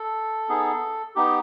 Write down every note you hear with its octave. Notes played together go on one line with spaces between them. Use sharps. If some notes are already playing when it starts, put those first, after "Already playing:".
Already playing: A4
B3 D#4 G#4
B3 D#4 G4